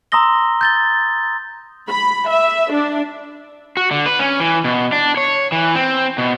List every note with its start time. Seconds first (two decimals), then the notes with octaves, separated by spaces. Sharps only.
0.12 A#5 C6 D#6 E6 A#6 G7
0.61 G6 A6 G7
1.89 B5
2.29 E5
2.73 D4
3.77 F#4
3.91 D3
4.06 B4
4.19 C#4
4.40 E3
4.64 B2
4.92 D4
5.17 C#5
5.52 E3
5.75 C4
6.18 B2